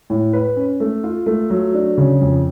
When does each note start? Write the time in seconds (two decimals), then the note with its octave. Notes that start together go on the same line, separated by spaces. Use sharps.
0.10 A2
0.33 B4
0.56 C#4
0.80 A3
1.04 F4
1.26 A3
1.50 F#3
1.74 D4
1.97 C#3
2.21 F2